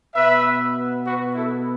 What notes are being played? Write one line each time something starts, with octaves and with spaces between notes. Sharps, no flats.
B2 B3 B4 E5
F#4 B4
E4 A4